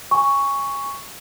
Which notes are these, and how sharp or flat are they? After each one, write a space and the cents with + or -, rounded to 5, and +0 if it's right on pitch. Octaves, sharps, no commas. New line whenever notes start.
G#5 -20 C#6 +5